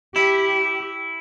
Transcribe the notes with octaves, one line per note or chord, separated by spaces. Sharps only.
E4 G4